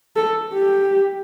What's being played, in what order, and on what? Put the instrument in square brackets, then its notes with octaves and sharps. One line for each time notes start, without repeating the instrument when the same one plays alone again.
[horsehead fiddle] A4
G4